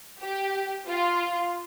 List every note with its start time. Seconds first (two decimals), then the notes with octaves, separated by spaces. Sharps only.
0.21 G4
0.88 F4